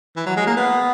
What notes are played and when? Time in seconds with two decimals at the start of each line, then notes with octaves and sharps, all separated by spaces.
0.16 E3
0.26 F#3
0.37 G#3
0.47 A#3
0.57 B3